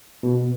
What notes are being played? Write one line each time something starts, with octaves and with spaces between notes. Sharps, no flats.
B2